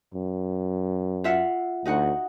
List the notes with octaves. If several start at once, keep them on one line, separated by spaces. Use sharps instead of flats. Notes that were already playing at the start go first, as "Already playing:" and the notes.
F#2
F4 E5 F#5
D2 D#4 F#4 F#5